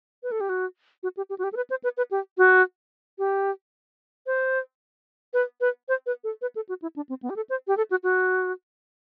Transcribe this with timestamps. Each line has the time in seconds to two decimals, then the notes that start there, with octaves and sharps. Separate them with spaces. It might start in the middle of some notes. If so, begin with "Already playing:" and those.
0.23 B4
0.31 A4
0.41 G4
0.49 F#4
1.03 F#4
1.17 G4
1.30 G4
1.39 F#4
1.44 G4
1.53 A4
1.56 B4
1.70 C5
1.84 B4
1.97 B4
2.11 G4
2.38 F#4
3.19 G4
4.27 C5
5.34 B4
5.61 B4
5.89 C5
6.06 B4
6.24 A4
6.42 B4
6.56 A4
6.69 F#4
6.82 E4
6.96 D4
7.09 C4
7.22 B3
7.30 G4
7.36 A4
7.50 C5
7.68 G4
7.77 A4
7.91 F#4
8.03 F#4